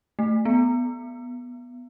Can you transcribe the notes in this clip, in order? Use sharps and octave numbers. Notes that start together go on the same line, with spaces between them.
A3
B3